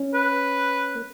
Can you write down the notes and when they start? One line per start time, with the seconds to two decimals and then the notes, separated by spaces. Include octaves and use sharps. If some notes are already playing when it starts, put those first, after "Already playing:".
Already playing: C#4
0.14 B4
0.95 A#3